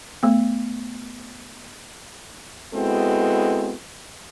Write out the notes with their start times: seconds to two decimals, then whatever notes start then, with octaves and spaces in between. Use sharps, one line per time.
0.23 A3 B3
2.74 G#3 B3 C4 E4 F#4 A4